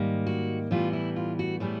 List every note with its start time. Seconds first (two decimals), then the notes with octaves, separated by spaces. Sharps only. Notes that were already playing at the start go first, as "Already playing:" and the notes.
Already playing: G#2 D#3 G3 A#3
0.26 F#4
0.71 A2 E3 G3 B3 F4
0.93 E4
1.16 F4
1.39 F#4
1.60 A2 E3 G3 B3 G#4